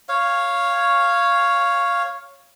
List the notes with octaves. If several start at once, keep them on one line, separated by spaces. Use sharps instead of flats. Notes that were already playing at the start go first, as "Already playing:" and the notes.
C#5 F5